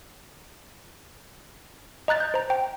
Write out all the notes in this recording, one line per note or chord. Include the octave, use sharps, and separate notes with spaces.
D#5 A#5 F#6 A6
G6
C5 A#5
G5